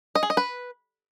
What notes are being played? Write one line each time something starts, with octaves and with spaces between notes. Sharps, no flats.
D#5
G#4
D#5
B4